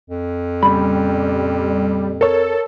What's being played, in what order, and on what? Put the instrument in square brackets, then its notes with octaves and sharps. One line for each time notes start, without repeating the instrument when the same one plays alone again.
[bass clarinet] F2
[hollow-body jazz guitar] A#2 C#3 B5 [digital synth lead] G3
[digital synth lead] A4 [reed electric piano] A#4 C#5